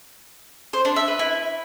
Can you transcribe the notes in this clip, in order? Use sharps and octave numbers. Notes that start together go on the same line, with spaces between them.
C5
D4
E5
B4
E4